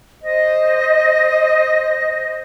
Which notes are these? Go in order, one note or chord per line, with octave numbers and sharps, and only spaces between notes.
C5 D#5